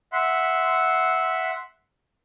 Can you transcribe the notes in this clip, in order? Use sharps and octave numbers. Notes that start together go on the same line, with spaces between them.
E5 F#5 C6